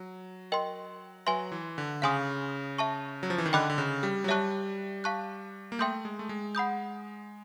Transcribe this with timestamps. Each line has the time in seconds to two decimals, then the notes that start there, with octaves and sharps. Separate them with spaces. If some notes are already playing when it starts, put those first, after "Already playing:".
Already playing: F#3
0.52 A#4 D#5 G5 C6
1.27 F#3 B4 E5 G#5 C6
1.52 E3
1.78 D3
2.02 C#3 F5 G#5 C6 D#6
2.78 E5 A5 C#6
3.23 F#3
3.30 F3
3.38 E3
3.46 D#3
3.53 D3 D#5 G5 B5 D6 F#6
3.70 D3
3.78 C#3
4.03 G3
4.24 F#3
4.28 G3 C#5 E5 A5 C#6 F#6
5.04 F5 A5 C#6 F#6
5.72 A#3
5.79 A3 E5 G5 C6 D#6 G6
6.05 G#3
6.19 A3
6.29 G#3
6.55 F#5 B5 D#6 G6